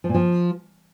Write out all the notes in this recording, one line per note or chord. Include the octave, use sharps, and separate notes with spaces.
F3
A#2
F3